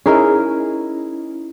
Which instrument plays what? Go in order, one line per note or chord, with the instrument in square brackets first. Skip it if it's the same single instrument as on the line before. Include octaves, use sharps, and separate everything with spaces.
[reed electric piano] C#4 D#4 E4 [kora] G#4 A#4 D#5